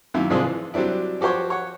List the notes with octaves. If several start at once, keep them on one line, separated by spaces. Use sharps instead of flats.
F#2 D#3 A#3 E4
C2 G#2 F3 D4 F4 G#4
E3
F#3 G3 C4 D4 E4
F3 F#4 G4 C5 C#5
C#5 F#5